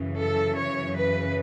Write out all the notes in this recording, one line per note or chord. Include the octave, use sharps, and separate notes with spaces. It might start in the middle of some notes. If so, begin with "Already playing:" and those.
Already playing: F#2 C#3 E3
A4
C#5
B4